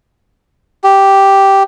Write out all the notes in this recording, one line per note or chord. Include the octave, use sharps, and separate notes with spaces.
G4